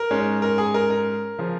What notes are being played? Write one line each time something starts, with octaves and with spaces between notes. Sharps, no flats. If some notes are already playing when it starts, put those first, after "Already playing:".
Already playing: A#4
G#2 G#3 C#4
A#4
G#4
A#4
A#4
C#3 F3